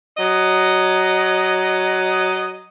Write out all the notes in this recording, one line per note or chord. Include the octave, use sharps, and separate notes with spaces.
F#3 D#5